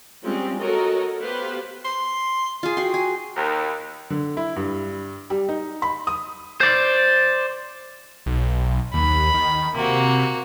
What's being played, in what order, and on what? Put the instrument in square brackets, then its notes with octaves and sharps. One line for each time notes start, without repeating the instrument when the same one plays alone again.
[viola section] F3 G3 G#3 C4 C#4
F#4 A4 A#4 C#5 D#5 A#5
B3 G4 B4 C5 F5
[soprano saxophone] C6
[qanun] F4 G#4
[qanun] F#4 C6 [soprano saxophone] G5
[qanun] G#4
[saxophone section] D#2
[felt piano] D3
E4
G2
G3
D#4
B5
D#6
[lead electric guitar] C5 D5
[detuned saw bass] B1
[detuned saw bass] D#2 [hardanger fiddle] B5
[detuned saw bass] D#3
[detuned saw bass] C3 [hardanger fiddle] A#3 F#4